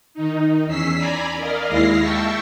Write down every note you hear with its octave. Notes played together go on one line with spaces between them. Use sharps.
D#3 D#4
E2 C#4 E6 B6 C7
D5 G#5 A#5 B5
A#4 D5 D#5 F5
D#2 G#3 E4 F5 A#6 C7
E5 G5 A5 C#6 E6